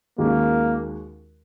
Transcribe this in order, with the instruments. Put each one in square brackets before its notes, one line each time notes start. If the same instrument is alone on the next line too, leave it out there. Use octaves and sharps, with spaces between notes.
[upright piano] D#2 D#3 G#3 C#4 F#4 [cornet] A#3